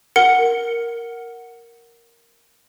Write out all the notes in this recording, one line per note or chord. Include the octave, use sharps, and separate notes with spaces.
A#4 F#5 C#7 G7